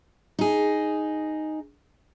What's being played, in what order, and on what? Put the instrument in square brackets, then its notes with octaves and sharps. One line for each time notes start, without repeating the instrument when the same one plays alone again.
[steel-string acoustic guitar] D#4 G#4